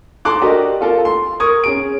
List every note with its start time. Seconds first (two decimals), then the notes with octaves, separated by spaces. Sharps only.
0.25 A4 A#5 C6 D6 F#6
0.41 D4 F#4 G4 A#4 D#5
0.81 F4 A4 A#4
1.05 C6
1.40 A#4 C#6 D#6 G#6
1.64 C#4 G#4 D7